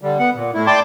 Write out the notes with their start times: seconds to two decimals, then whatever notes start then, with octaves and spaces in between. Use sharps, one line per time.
0.02 D3 G3
0.19 B3 F#5
0.35 A#2
0.54 A2 E4
0.67 D5 G5 A5 C6 D6